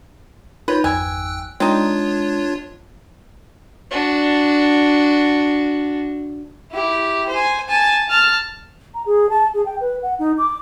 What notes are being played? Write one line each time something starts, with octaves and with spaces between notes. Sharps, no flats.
D#4 F4 B4 C#5 G6
G#1 F2 G5 G#5 E6 F#6
G#3 C4 D4 D#4 F4 C#5 D5
D4 F#4
E4 G4
C5 G#5
G#5 A5
A5 F6
A#5
G#4
A5
G#4
G5
B4
F#5
D#4
D6